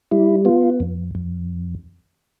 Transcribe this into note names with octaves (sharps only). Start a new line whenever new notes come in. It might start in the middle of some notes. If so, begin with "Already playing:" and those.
G3 E4
B3 F4
F2
F2